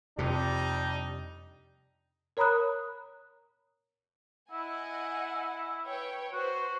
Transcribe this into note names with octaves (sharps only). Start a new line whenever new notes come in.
F2 C3 G3 D4 D#4
A#4 C#5 A#5 B5 D#6 F#6
E4 D#5 F#5 G#5
B4 C#5 G5
F#4 B4 C5